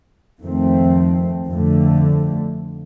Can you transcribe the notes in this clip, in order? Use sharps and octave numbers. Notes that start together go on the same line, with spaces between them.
F2 D#3 A3 C4
F2 D3 A3